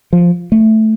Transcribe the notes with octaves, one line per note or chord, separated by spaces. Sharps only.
F3
A3